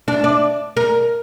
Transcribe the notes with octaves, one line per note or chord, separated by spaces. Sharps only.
D4
D5
A#4